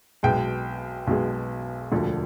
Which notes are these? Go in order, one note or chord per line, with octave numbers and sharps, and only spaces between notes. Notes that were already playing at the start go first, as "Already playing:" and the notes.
B1 B2 G#3 G5
B1 B2 G#3
E1 D2 D3 F3